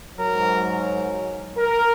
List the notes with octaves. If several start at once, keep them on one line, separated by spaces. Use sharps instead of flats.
G#2 F#3 A#4
A#4